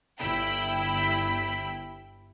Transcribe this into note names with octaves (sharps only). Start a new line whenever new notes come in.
G1 E4 G5 B5